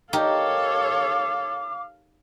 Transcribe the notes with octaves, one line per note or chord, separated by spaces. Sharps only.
D#4 G4 A4 A#4 C#5 F5 D6